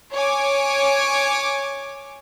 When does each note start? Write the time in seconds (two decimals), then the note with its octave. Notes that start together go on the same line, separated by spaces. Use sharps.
0.13 C#5 G#5 D6